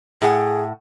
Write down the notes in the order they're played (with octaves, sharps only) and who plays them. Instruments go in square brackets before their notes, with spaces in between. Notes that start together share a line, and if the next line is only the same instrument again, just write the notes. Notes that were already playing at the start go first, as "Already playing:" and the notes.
[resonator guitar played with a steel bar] A2 A3 F#5 [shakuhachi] G#4